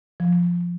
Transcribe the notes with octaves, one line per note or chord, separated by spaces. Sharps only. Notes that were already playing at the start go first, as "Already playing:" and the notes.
F3